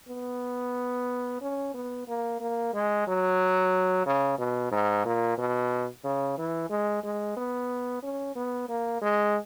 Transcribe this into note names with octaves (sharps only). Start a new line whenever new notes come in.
B3
C#4
B3
A#3
A#3
G#3
F#3
C#3
B2
G#2
A#2
B2
C#3
E3
G#3
G#3
B3
C#4
B3
A#3
G#3